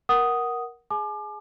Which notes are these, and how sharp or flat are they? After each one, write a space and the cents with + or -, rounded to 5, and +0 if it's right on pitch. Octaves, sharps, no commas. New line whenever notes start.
A#4 +15 F#5 +5 D#6 +0
G#4 +0 G#5 +40 D6 +35